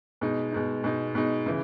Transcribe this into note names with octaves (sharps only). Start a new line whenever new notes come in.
B2 G#3 D#4
B2 G#3 D#4
B2 G#3 D#4
B2 G#3 D#4
C#3 E3